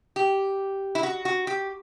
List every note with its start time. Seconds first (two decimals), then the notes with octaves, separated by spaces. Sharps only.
0.16 G4
0.95 E4
1.03 F#4
1.25 F#4
1.47 G4